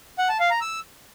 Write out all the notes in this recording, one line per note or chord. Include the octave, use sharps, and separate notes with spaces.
F#5
A5
F5
A#5
E6